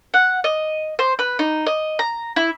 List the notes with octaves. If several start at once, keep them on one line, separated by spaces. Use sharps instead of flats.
F#5
D#5
C5
B4
D#4
D#5
A#5
E4